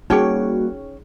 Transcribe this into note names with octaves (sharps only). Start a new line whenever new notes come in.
G3 A#3 C#4 D#4 F#4 G#4 C#5 G5